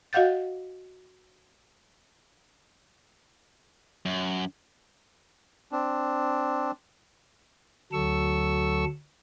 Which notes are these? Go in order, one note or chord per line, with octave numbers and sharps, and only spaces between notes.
F#4 D#5 F5 F#5 G6 A6
F#2
C4 D4
D2 F#3 A4 C#6 E6